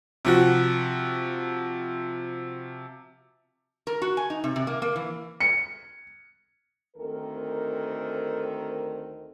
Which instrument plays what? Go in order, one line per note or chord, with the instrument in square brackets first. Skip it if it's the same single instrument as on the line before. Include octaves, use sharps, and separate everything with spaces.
[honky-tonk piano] C3 F3 F#4
[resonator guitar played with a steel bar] A#4
F#4
G#5
D#4
C3
C3
A#3
A#3
E3
[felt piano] C#7
[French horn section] D2 D#3 C4 A4 A#4